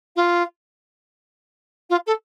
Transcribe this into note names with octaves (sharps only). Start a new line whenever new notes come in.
F4
F4
A4